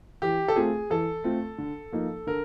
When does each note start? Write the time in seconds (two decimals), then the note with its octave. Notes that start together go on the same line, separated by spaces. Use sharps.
0.22 E3 G4
0.48 A4
0.56 A3 C4 F4 G#4
0.90 E3 A4
1.24 A3 C4 F4
1.58 D3
1.92 F3 A#3 D#4
2.27 D3 A#4